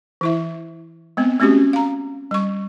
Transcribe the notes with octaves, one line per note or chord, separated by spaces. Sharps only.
E3 E4 E5
G#3 B3 C4
A3 C4 C#4 F#4 G4
F5 A#5
G3 C#6